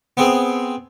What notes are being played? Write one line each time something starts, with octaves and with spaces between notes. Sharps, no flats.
B3 C4 G#4